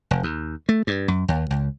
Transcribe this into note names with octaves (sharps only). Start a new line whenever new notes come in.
F1
D#2
A3
G2
F#2
D#2
C#2